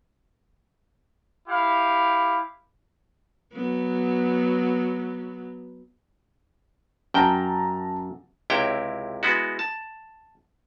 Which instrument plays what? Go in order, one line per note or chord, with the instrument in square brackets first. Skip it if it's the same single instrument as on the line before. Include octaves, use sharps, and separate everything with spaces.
[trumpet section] E4 G4 F5
[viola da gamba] F#3 B3
[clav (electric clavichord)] F#2 G5 [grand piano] A5 A#5
[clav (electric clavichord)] C#2 C3 E4 C#5 G5
G#3 B3 E4 F#4
A5